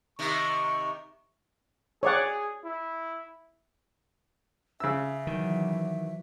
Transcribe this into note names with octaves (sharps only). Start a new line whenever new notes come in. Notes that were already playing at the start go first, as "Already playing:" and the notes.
C3 D#3 C#6
G#4 C#5 D5 F#5
E4
C#3 E5 E6
D#3 E3 F#3